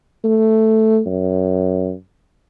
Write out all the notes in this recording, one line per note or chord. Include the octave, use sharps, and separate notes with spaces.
A3
F#2